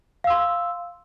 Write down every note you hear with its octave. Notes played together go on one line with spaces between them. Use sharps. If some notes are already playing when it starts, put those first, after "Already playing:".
F5 C6 E6